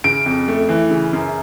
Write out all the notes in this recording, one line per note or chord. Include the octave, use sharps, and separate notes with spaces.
C#3 D7
F2
A3
E3
C#3
F#2